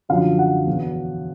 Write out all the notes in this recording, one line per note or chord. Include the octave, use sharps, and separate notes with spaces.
F#2 D3 F3 F5
F#5
E2 B2